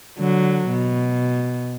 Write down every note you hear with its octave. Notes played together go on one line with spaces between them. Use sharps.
D3 F#3
B2